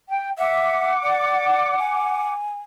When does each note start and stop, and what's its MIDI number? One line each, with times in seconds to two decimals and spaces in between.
0.08 0.29 79
0.38 0.91 76
0.38 2.32 78
0.38 2.32 86
1.03 1.75 74
1.79 2.59 80